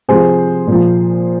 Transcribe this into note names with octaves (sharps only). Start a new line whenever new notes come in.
C3 F3 G#4 C5
A#2
F3